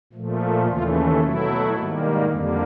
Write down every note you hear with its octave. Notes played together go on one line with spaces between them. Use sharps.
A#2 F3 A3
D#2 C#3 E3 A3 F4
B2 F#3 A3 E4
G#2 D#3 G3 A#3
F2 D3 G3 A#3